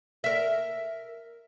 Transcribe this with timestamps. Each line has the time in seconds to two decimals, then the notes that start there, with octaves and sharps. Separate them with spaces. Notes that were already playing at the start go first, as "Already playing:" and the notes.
0.24 A#4 E5